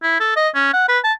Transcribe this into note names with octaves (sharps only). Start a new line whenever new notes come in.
E4
A4
D#5
C#4
F#5
B4
A5